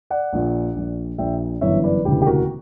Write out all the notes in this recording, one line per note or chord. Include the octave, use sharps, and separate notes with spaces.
D5 F#5
A#1 A#2
A#1 A#2
A#1 A#2 E5 G5
G1 F#2 E3 C#5 E5
B4 D5
E1 D2 C#3 E3 G4 B4
G4
F#4 A#4